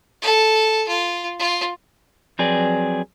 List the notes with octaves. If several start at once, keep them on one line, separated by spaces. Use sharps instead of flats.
A4
F4
F4
F3 F#3 C4 G#4 B4 D5